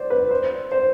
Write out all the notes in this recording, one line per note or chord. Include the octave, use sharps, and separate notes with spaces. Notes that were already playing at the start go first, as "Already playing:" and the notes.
Already playing: C5 D5
B4
C5
C5